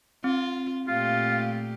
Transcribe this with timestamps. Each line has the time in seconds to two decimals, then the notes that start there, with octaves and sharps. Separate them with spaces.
0.24 C4 F4
0.88 A#2 A3 F4 G4 F5